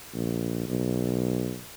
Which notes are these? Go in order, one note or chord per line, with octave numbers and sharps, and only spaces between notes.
A#1
B1